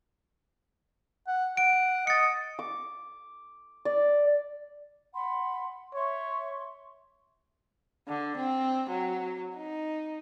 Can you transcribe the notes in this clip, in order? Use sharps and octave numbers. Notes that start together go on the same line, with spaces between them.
F#5
F#5 D7
D#5 A6 C#7
D6
D5
F#5 B5 C6
C#5 E5 C6 C#6
D3
C4
F#3
D#4